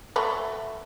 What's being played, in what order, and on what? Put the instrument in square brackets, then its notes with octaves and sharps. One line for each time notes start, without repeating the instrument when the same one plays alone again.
[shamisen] F#3 A3 B4